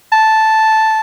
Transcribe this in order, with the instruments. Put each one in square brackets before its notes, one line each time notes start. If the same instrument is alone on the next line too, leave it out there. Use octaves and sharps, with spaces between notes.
[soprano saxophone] A5